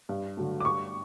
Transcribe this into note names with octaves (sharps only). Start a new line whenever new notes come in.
G2
D3 F#3 A3
D6
G2 C#6